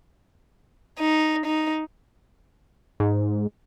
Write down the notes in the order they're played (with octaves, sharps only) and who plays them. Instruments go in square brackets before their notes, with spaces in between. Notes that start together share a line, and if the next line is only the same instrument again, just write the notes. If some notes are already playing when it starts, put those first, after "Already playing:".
[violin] D#4
D#4
[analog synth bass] G#2